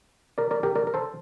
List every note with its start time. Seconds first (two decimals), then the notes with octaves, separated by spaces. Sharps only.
0.38 A#4 D5
0.51 A#4 D5
0.63 G4 A#4
0.76 A#4 D5
0.87 A#4
0.94 A4 C5